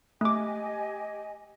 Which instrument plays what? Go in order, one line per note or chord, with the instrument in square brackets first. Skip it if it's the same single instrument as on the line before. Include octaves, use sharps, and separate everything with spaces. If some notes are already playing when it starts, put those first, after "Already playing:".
[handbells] A3 D6 [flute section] G4 D#5 G#5